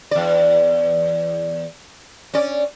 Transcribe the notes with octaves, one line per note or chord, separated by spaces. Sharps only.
E2 D5
C#4 D5